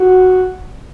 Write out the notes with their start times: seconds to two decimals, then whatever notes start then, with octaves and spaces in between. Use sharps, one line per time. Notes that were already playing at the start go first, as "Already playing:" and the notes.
Already playing: F#4